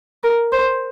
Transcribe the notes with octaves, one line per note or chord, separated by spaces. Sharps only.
A#4
C5